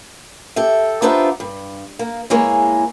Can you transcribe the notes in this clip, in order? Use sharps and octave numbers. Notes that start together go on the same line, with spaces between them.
G4 A4 E5
B3 D4 D#4 F4 C5 E5
G2
A#3
E2 E3 G#3 A#3 C#5